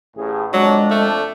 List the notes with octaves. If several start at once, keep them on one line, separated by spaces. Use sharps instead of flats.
A1 A2 G#4
F2 F#3 G#3 D4
A3